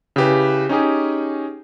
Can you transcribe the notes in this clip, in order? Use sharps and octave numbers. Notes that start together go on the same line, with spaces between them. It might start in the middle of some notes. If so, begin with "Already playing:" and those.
C#3 E4 G4 B4
C#4 D#4 G4 G#4